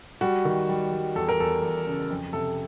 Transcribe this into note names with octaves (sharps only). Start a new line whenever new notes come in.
G3 F#4
D#3
G3
G3
E2 A4
A#4
E2 A4
E2
C#3
F2
C3 A4